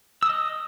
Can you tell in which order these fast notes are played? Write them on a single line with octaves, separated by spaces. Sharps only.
E6 D#6 D#5